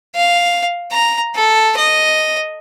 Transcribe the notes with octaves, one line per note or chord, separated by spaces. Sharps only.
F5
A#5
A4
D#5